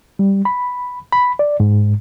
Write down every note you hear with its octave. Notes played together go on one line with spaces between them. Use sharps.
G3
B5
B5
D5
G#2